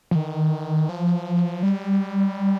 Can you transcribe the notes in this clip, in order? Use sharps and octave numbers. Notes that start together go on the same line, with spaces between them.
F3
D#3
F3
G3